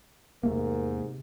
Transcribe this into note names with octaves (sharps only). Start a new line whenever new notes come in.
E2 G#2 C3 A3 A#3 A#4